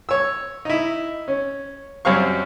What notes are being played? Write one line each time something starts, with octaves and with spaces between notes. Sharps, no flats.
C#5 E6
D#4 E4
C#4
F#2 G3 C4 F5 C#6